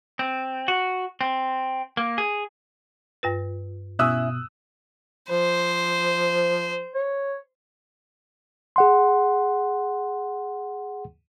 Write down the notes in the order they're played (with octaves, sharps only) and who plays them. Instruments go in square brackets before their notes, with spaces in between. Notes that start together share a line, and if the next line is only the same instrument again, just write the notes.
[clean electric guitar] C4
F#4
C4
A#3
G#4
[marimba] G2 F4 B4
[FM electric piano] B2 [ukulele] C#4 E4 E5 [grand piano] D#6 E6 F#6
[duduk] F3 [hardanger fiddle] C5
[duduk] C#5
[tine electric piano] G#4 F#5 C6